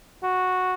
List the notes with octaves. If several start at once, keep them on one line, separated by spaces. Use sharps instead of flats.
F#4